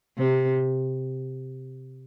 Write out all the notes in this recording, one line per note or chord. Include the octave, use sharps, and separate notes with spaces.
C3